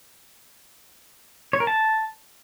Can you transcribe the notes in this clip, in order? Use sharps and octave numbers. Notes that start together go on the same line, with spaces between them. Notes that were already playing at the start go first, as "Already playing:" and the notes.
C#5
A#4
A5